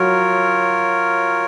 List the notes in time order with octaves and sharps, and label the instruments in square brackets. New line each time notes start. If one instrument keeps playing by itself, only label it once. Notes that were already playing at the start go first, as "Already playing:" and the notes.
Already playing: [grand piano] F#3 [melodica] F4 A#4 C#5